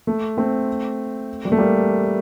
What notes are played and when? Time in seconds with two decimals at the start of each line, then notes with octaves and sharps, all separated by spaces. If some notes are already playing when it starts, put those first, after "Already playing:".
0.07 A3
0.37 A3 C4
1.45 G3
1.52 A3
1.58 G3 A#3